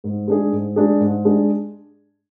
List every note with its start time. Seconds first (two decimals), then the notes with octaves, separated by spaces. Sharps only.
0.04 G#2
0.28 G#3 D4 G#4
0.52 G#2
0.76 G#3 D4 G#4
1.00 G#2
1.25 G#3 D4 G#4